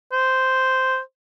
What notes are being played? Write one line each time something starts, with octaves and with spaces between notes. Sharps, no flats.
C5